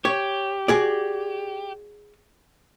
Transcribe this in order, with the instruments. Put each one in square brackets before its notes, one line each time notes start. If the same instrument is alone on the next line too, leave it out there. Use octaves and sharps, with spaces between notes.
[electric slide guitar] G4 [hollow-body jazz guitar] C#5
[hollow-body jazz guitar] F#4 G#4 D5